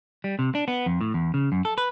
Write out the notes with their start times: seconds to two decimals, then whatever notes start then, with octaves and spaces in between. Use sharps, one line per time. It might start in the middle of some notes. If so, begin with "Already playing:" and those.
0.24 G3
0.39 C3
0.55 D4
0.68 B3
0.86 F2
1.01 A2
1.14 E2
1.34 C#3
1.52 F#2
1.65 A4
1.78 B4